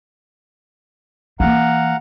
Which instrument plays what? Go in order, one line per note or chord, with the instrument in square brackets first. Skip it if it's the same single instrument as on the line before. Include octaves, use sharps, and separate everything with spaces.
[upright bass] E3 A#3 [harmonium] F5 F#5 A#5